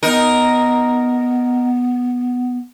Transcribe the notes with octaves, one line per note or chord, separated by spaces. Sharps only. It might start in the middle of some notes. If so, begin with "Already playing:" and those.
B3 D#4 A#4